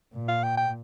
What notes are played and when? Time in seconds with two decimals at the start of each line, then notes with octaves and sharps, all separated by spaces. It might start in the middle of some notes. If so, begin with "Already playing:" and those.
0.13 A#2
0.28 F5
0.43 G5
0.58 G5